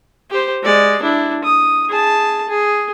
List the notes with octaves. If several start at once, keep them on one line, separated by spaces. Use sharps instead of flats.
G4 C5
G#3 D5
D4 E4
D#6
G#4 A5
G#4